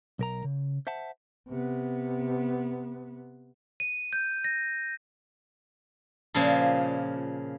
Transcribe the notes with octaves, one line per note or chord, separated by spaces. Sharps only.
B1 A#4 A#5
C#3
C5 E5 F#5 A5
C3 B3
D#7
G6
A#6
A#2 C#3 F3